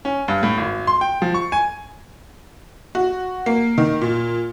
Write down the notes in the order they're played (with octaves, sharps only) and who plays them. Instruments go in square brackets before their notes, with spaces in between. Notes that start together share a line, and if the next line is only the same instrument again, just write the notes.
[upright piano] C#4
G2
A2
G#1
C6
G5
F3
C#6
G#5
[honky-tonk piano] F#4
A#3
D#3
A#2